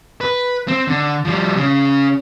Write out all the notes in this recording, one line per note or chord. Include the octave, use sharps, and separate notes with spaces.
B4
C4
D3
F3 G3
C#3 C#4